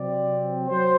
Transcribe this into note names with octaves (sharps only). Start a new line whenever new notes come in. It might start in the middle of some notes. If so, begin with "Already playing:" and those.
Already playing: C3 F#3 C4 D5
F#3 C5